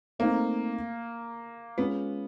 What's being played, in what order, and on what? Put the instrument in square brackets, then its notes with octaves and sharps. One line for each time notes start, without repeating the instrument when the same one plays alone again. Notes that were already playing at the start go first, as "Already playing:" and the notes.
[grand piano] A3 C4 D#4 [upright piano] A#3
[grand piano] G#3 C#4 F4 [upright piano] B3